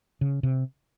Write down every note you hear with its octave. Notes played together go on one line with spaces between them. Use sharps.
C#3
C3